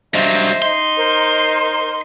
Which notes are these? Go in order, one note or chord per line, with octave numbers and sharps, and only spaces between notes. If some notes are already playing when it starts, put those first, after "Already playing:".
G2 F#3 C5 D#5 E5
D#4 C6
A#4 C5